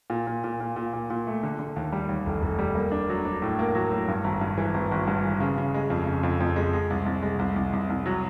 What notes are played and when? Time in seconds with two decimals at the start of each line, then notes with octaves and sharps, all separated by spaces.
0.10 A#2
0.27 A#2
0.44 A#2
0.60 A#2
0.76 A#2
0.93 A#2
1.10 A#2
1.27 A3
1.43 D3
1.59 D3
1.76 D#2
1.92 G3
2.09 D#2
2.26 F1
2.43 F1
2.59 G3
2.75 A#3
2.91 D4
3.09 F#3
3.25 D4
3.42 A2
3.59 A#3
3.75 F#3
3.91 A2
4.08 G2
4.24 G#1
4.41 G2
4.58 E3
4.74 G#1
4.91 G#1
5.07 G2
5.24 E3
5.40 C#3
5.58 C#3
5.74 G#3
5.90 F2
6.07 C#3
6.23 F2
6.40 F2
6.56 G#3
6.73 G#3
6.90 C2
7.06 C2
7.22 G#3
7.39 C2
7.56 C2
7.73 C2
7.90 C2
8.06 F#3